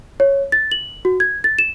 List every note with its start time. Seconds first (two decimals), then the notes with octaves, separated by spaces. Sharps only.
0.20 C#5
0.52 A6
0.72 F#7
1.05 F#4
1.20 G#6
1.44 A6
1.59 E7